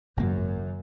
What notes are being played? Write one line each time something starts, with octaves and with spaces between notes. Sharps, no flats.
G#1 F#2 C#3 A#3